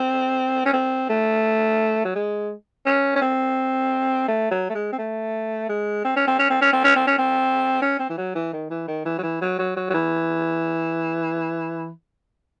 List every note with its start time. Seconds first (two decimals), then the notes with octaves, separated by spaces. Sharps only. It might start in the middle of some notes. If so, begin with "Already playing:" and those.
Already playing: C4
0.66 C#4
0.74 C4
1.09 A3
2.05 F#3
2.15 G#3
2.86 C#4
3.16 C#4
3.22 C4
4.28 A3
4.51 F#3
4.70 A3
4.75 G#3
4.93 C4
4.98 A3
5.69 G#3
6.05 C4
6.16 C#4
6.27 C4
6.39 C#4
6.50 C4
6.62 C#4
6.73 C4
6.84 C#4
6.96 C4
7.07 C#4
7.19 C4
7.82 C#4
7.99 C4
8.10 E3
8.18 F#3
8.35 E3
8.53 D#3
8.70 E3
8.88 D#3
9.06 E3
9.18 F#3
9.23 E3
9.41 F#3
9.59 F#3
9.77 F#3
9.90 F#3
9.94 E3